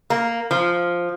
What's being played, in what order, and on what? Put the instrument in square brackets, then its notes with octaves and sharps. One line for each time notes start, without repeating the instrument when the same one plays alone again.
[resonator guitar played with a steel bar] A#3
F3